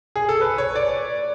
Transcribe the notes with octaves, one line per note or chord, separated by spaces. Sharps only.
G#4
A4
B4
C#5
D5